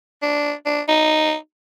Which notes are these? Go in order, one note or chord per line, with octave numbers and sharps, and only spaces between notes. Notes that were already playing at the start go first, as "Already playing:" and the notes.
D4
D4
D#4